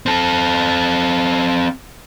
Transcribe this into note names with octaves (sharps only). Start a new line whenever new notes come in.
C4 A4